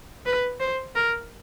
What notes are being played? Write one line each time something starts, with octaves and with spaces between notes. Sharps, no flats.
B4
C5
A#4